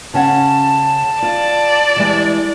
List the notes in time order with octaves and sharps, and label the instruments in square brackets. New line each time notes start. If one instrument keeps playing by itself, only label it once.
[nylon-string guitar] C#3 C#4 F#5 [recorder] A5
[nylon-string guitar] F4 [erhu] D5
[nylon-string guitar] E3 G3 G#3